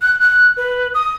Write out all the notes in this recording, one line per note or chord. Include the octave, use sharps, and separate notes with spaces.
F#6
F#6
B4
D#6